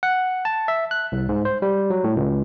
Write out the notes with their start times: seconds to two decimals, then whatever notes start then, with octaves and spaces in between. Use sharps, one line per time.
0.03 F#5
0.45 A5
0.68 E5
0.91 F#6
1.12 C2
1.29 G#2
1.45 C5
1.62 G3
1.90 F#3
2.04 A2
2.17 C#2